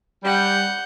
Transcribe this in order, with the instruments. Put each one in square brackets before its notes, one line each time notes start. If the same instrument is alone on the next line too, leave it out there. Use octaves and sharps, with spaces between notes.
[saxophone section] G3 [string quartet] F#5 G6